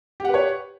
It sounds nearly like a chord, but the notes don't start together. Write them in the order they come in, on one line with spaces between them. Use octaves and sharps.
G4 F#5 B4 C#5